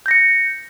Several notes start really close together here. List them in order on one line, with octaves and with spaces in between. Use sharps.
G6 A#6 C#7